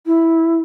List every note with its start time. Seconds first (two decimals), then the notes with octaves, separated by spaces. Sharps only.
0.06 E4